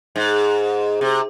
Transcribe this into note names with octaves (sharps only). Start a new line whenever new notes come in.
G#2
C3